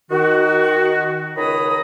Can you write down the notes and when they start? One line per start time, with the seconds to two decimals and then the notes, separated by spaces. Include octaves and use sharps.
0.11 D#3 F#4
1.37 C#2 D#3 C#5 A#5 B5 D#6